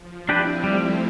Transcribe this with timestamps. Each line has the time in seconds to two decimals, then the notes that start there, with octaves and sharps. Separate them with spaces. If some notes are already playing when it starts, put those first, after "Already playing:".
Already playing: F3
0.28 C4 D4 E4 G4 B4
0.64 G3 A3 C4